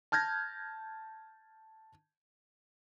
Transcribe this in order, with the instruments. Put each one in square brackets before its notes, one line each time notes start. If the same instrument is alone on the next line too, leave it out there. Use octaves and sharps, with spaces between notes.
[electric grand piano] A5 F6 G6 G#6 A#6